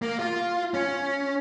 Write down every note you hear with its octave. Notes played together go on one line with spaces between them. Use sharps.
A#3
F4
C#4